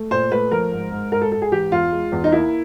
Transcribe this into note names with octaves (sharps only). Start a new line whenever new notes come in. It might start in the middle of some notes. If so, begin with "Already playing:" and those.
Already playing: A3
A#2 C5
A3 B4
F3 A#4
G#2
G#2
G#2 A#4
A4
G#2 A4
G#4
E3 G4
E2 F4
G#3
E2
D#4
A#3 E4